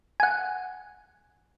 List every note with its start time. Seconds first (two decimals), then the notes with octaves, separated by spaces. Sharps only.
0.20 F#5 G#5